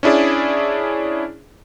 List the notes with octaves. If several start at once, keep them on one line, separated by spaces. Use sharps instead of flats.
C#4 D4 E4 G#4 D5